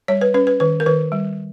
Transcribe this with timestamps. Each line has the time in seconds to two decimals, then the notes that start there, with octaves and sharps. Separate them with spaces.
0.08 G3 C#5
0.21 B4
0.34 C#4 B4
0.47 B4
0.60 D#3 B4
0.80 A#4
0.86 D#3 B4
1.12 G3